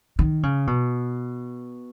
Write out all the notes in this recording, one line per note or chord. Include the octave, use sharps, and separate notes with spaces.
D#3
C#3
B2